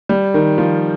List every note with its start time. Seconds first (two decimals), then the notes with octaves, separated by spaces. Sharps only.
0.09 G3
0.34 D#3
0.58 F3